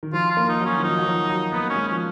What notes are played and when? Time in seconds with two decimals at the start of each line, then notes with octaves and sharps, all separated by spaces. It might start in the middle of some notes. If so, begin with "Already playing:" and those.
0.03 D#3
0.13 F3 F4
0.31 F4
0.37 A#3
0.48 D#4
0.60 F#3 C#4
0.77 D#3
0.83 F3 D#4
0.99 F#3
1.07 F3
1.30 F#3
1.52 A#3 B3
1.70 C#4
1.76 G#3
1.87 C#4
1.92 F3